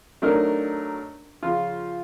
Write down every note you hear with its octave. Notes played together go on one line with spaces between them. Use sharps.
F#3 A3 D4 D#4 A#4
C#3 F3 F4